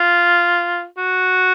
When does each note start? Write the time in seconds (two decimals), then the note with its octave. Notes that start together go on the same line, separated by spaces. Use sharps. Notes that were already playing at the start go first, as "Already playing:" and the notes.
Already playing: F4
0.98 F#4